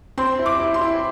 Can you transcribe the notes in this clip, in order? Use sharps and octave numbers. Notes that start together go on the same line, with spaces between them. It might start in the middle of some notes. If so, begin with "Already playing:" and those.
C4 C6
E4
D6
E4
C6
E4